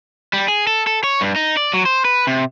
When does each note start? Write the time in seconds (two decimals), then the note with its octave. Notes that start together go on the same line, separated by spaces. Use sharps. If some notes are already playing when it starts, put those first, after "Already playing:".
0.33 G3
0.48 G#4
0.67 A4
0.87 A4
1.04 C#5
1.21 G2
1.36 D#4
1.57 D5
1.74 F#3
1.85 C5
2.05 B4
2.27 C3